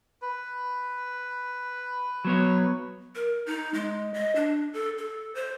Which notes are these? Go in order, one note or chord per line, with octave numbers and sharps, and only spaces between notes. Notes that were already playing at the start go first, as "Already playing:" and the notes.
B4
F#3 B3 C#5
A#4
D#4
G#3
D#5
D4
A4
A4
C5